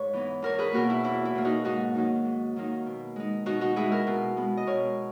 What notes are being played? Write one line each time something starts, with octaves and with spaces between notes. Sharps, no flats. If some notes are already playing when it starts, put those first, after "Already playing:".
Already playing: G#2 B4 C#5
E3 B3 D#4
E2 A#4 C#5
G#4 B4
B2 A#3 F#4 A#4
E4
E2 E4
E4
B2 A#3
D#4 F#4
G#2 D#4 F#4
D#3 F#3 A#3 D#4
G#2
D#3 F#3 A#3 D#4
B2
G#3 D#4
B2 D#4 F#4
D#4 F#4
G#3 D#4 E4 G#4
F#4 A#4
B2
G#3 B3
D#5
B2 A#4 C#5